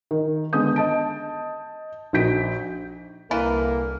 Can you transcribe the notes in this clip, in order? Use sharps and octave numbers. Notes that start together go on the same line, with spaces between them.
D#3
D3 G#3 B3 D#6 G6
D#5 A5 D7
A#1 D#4 F#4 G6 B6 D7
C2 D3 E3 A#3 A#4